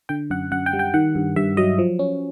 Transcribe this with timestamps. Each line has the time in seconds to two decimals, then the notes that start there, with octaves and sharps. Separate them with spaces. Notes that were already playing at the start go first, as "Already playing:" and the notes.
0.09 D3 G5
0.30 F#2 F#5
0.52 F#2 F#5
0.66 G5
0.73 G3
0.79 G5
0.94 D#3 F#5
1.15 G2
1.36 G2 E5
1.57 F#3 D#5
1.78 F3
1.99 C#4